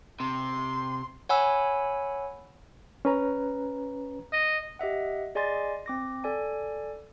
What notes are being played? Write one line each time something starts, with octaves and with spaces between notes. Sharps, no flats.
C3 C6
C#5 F#5 G#5 B5 E6
C#4 B4 A#5
D#5
G4 D#5 E5 F#5
G#4 D5 D#5 G#5 C6 A6
C4 D6 A#6
A4 D5 G#5